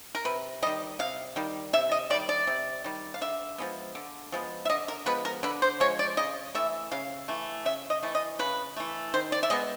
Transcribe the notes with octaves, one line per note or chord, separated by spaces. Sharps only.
A#4
C3 B4
D#3 G3 D#5
C3 F5
D#3 G3
C3 E5
D#5
D#3 G3 D5
D5
C3
D#3 G3
F5
D3 E5
F3 G#3 B3
D3
F3 G#3 B3
E5
D3 D#5
A#4
F3 G#3 B3 B4
A#4
D3 B4
C5
F3 G#3 C#5
D5
C#3 D#5
E3 A3 E5
C#3 F5
E3 A3
C#3 E5
D#5
E3 A3
D#5
C#3 B4
E3 A3
D#3 C5
D5
E5
G#3 B3 D#5